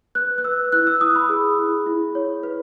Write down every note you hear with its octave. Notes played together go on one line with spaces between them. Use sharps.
B4 F#6
F#6
B4 E6
E4 F#6
E6
E4 D#6
B5
G#4
E4
E4
C#5
B4